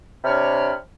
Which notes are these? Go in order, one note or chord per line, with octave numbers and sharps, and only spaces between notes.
C3 D4 C#5 B5 F6